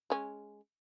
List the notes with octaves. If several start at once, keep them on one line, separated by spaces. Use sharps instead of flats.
G#3 C#4